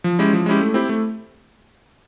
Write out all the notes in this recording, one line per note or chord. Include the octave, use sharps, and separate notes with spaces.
F3
G#3 C#4 E4 G4
F3
G#3 C#4 E4 G4
A3
C4 E4 G4
A3